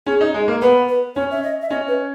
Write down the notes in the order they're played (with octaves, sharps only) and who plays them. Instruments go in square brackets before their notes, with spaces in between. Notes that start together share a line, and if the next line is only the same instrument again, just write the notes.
[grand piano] C#4 [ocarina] G#4
[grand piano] D#4
G#3
A#3
[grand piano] B3 [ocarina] B4
[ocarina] B4
[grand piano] C#4 [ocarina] C#5
[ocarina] E5
D#5
E5
[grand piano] C#4 [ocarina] D#5
[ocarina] B4